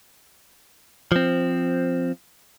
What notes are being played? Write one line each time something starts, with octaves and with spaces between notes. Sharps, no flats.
F3 C4